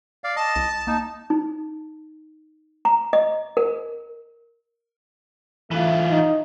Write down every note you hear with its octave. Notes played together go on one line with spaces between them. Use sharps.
D5 F5
D#5 A5
C2
A#3 D#4
D#4
A#5
D#5
A#4
E3 A3 F4
D#4